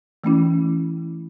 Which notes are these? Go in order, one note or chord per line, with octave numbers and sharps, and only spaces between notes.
E3 A3 C#4 E4